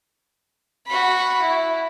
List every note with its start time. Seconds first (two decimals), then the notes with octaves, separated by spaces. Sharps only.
0.87 F#4 B5
1.42 E4